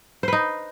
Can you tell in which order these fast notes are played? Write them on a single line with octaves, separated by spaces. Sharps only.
C5 B4 D#4